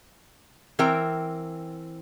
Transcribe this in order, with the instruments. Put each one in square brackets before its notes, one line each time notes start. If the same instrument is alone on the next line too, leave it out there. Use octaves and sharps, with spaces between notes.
[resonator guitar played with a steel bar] E3 C4 A#4 G5 A#5